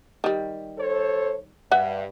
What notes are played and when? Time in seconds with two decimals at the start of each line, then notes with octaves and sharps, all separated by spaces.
0.24 D#3 G3
0.78 A4 C5 C#5
1.71 G2 B4 E5 F#5